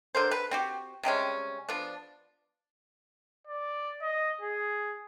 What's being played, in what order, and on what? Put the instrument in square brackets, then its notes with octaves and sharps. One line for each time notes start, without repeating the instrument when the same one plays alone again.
[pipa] D3 A#4 C5
B4
C4 F#4 G4
C3 G3 G#3 C#4
F3 B3 D4
[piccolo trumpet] D5
D#5
G#4